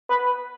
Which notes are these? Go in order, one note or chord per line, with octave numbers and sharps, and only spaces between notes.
B4